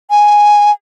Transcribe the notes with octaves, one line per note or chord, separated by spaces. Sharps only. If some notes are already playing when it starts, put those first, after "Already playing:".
G#5